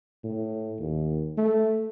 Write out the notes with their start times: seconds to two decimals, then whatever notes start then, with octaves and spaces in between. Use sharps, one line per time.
0.24 A2
0.79 D#2
1.38 A3